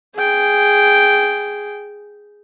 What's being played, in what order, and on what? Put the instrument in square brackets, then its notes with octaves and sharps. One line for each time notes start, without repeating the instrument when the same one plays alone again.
[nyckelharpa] G#4 G5